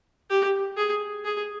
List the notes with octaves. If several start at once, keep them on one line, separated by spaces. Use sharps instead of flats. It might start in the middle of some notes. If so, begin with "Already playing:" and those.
G4
G#4
G#4